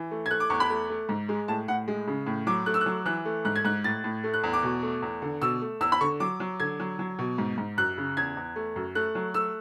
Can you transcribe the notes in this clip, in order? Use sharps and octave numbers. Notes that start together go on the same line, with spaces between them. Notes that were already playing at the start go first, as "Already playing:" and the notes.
Already playing: E3
A3
G#6
A3 F#6
D6
E2 C#6
B5
A3
A3
G#2
G#3
A2 A5
A2 F#5
G#3
C#3
A2
F#3 D6
A3 F#6
E6
F#6
F#3
E3 F#6
A3
G#2 F#6
G#6
G#2 F#6
A2 A6
A2
A3
F#6
E2
D6
B2
A3
E2
D3
B2 E6
A3
E2 E6
B5
D3 C#6
F#3 D6
F#3
D3 G#6
F#3
F#3
B2
G#2
G#2
F#2 F#6
C#3
E2 G#6
E2
A3
F#2
A3 F#6
F#3
A3 E6